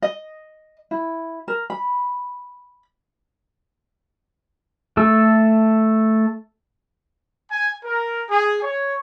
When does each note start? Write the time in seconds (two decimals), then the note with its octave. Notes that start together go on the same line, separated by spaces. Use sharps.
0.02 D#5
0.91 E4
1.48 A#4
1.70 B5
4.97 A3 A4
7.51 G#5
7.84 A#4
8.30 G#4
8.63 C#5